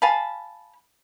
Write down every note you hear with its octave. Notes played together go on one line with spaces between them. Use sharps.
F5 G#5 A5 B5